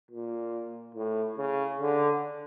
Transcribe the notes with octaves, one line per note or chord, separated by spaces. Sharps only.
A#2
A2
C#3
D3